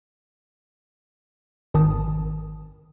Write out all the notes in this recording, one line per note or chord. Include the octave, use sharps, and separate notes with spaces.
G#1 D#3 A5 D#6